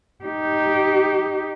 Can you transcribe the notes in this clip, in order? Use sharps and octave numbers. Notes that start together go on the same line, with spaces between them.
D#4 G4